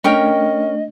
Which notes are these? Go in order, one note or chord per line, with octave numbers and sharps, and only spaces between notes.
A3 C#4 D4 A#4 D#5 G5